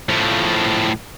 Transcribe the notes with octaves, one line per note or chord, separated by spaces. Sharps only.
A2 F3